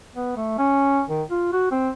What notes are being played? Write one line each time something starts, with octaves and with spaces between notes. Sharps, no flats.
B3
A3
C#4
D#3
F4
F#4
C4